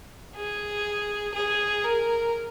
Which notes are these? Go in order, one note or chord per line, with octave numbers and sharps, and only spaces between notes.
G#4
G#4
A#4